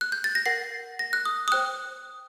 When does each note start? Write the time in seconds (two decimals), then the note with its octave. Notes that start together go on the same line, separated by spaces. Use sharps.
0.01 F#6
0.12 G6
0.24 A6
0.35 A#6
0.46 A#4 F#5 C7
0.99 A#6
1.13 F#6
1.25 D#6
1.48 D#6
1.52 C5 G5 F#6